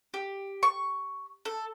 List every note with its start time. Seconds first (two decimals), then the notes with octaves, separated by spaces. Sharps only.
0.14 G4
0.63 C#6
1.45 A4